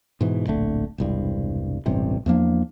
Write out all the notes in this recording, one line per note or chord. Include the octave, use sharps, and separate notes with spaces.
G#2 B2 E3
D1 A#1 D3 A3
E1 C2 G2
E1 A1 G2 C3
E2 F3 A#3 D4